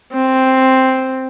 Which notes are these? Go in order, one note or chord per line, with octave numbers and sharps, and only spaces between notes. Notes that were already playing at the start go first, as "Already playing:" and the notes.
C4